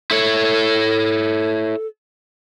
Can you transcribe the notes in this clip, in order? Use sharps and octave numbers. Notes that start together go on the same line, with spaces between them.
E4 A4 C#5